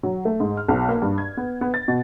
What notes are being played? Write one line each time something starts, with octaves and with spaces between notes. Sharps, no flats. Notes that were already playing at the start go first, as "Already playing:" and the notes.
F#3
A3
G#2
F6
B1
A#3
G2
G#6
B3
B3
A6
B2